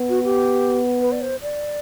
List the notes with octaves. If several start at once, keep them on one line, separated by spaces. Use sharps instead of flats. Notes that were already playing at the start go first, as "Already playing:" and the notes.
Already playing: B3
F#4
G4
B4
D5
C5
D5